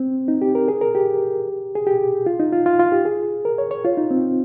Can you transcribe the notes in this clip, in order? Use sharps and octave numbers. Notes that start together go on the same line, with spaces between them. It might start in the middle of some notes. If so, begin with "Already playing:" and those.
Already playing: C4
D#4
G4
A#4
G#4
A#4
G4
G#4
G4
F4
D#4
F4
F4
F4
G4
G#4
A#4
C#5
C#5
F4
D#4
C4